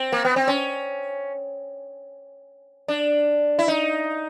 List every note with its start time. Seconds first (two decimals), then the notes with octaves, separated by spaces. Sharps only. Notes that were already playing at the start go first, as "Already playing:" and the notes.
Already playing: C4
0.12 A#3
0.25 B3
0.36 C4
0.48 C#4
2.88 D4
3.59 E4
3.68 D#4